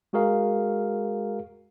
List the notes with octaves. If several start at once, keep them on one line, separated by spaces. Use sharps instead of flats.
G#3 F#4 G#4 A#4 F5